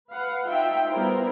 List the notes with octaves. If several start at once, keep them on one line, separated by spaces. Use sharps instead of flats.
B4 F5 F#5
D#4 F4 E5 G5
G3 B3 E4 A#4 C5